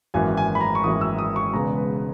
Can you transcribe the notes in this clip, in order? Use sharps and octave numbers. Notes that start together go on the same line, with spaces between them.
G#1 F#2 E3 A#3 G#5
G#5
B5
A#5
C#6
G#1 F#2 E3 A#3 D#6
E6
D#6
C#6
E1 E2 C#3 G#3 B3 A#5
B4